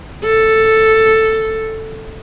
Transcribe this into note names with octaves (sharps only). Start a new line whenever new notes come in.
A4